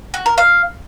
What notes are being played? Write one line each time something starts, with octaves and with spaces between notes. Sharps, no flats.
F#4
A#4
F5